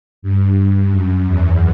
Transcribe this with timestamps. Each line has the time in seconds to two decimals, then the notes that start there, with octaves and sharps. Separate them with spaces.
0.22 G2
0.91 F#2
1.25 E2